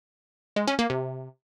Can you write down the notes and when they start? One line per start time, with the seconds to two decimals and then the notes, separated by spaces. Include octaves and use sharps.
0.56 G#3
0.68 C#4
0.79 A#3
0.90 C3